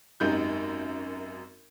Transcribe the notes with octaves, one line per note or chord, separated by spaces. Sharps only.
G#1 F#2 D#4 G4 G6